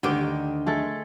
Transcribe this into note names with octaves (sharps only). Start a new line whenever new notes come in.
D2 D3 D#3 G4
G#3 A3 A4